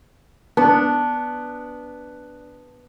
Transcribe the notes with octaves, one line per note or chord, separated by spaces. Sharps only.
B3 D4